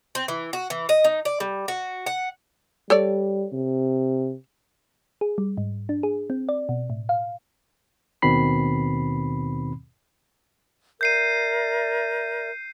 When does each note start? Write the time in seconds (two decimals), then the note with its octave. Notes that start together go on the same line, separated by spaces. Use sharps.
0.15 C4
0.28 E3
0.53 F#4
0.70 E3
0.89 D#5
1.04 D#4
1.25 D5
1.40 G3
1.68 F#4
2.06 F#5
2.90 G3 A4 C#5 D5
3.53 C3
5.21 G#4
5.38 G3
5.58 G#2
5.89 D4
6.03 G#4
6.30 C4
6.49 D5
6.69 B2
6.90 A2
7.09 F5
8.22 D#2 B2 D#3 C4 B5 C7
11.01 A#4 D5 E5 G6 C7 D#7